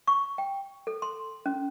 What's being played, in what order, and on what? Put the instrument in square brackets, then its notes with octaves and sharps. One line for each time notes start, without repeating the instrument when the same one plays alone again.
[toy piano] C#6
G5
A4
C6
C#4